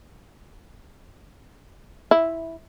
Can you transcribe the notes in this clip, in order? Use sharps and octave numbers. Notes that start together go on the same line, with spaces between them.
E4